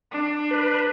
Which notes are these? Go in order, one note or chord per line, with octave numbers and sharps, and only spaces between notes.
D4
B4